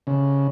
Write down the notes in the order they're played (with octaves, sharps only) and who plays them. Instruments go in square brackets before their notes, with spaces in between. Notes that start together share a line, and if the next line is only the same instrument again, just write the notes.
[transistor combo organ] C#3